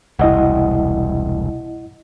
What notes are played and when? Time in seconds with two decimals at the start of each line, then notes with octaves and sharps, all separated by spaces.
0.19 E1 C2 E4 D#5 F#5